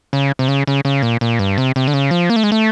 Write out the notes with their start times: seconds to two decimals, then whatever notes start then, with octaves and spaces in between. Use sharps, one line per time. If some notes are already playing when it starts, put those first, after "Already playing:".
0.13 C#3
0.39 C3
0.48 C#3
0.67 C#3
0.85 C#3
1.02 A#2
1.21 A#2
1.39 G2
1.58 C3
1.76 C3
1.88 D3
1.94 C#3
2.11 F3
2.30 A#3
2.36 A3
2.43 G#3
2.52 A3